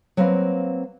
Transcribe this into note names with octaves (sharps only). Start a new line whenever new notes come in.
F#3 A#3 C4 B4 F5